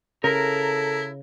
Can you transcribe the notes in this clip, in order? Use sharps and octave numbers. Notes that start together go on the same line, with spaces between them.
C#3 E4 A4 A#4